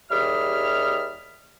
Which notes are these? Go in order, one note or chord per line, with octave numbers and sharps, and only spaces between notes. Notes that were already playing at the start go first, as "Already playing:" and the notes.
D#2 G3 G#4 E5 F6